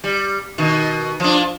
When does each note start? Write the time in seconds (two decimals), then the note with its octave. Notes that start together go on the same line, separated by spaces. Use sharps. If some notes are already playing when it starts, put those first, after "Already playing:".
0.04 G3
0.58 B2 D#3
1.20 F3 D4